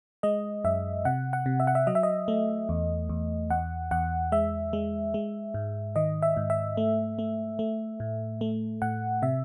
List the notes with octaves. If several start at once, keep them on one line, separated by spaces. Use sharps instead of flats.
G#3 D#5
F#2 E5
C3 F#5
F#5
C3
E5
F#5
E5
F#3 D#5
E5
D#5
A3
E2
E2
E2 F#5
E2 F#5
G#3 E5
G#3
G#3
G#2
D#3 D#5
E5
G#2
E5
A3
A3
A3
A2
A3
A2 F#5
C3 E5